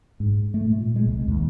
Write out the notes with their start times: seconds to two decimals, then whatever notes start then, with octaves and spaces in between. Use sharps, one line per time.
0.20 G#2
0.54 A3
0.66 A#2
0.96 G#3
1.08 C2
1.28 D#2